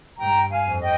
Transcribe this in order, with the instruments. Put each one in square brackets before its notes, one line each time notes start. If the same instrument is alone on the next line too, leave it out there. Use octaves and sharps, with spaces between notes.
[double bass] G2 [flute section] G5 A#5
[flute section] F5 G#5
[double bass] F2
[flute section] D#5 G5